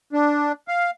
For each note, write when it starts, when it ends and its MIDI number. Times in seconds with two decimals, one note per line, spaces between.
0.13 0.52 62
0.68 0.91 77